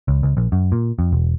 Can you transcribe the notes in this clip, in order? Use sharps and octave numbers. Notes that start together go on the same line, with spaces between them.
C#2
C#2
A#1
F#2
A#2
F2
E1